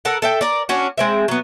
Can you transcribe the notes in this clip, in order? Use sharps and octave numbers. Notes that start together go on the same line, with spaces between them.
A4 A#4 F#5
A4 E5 G5
A#4 D5
C#4 D4 F#4
G#3 C4 E5
F#3 B3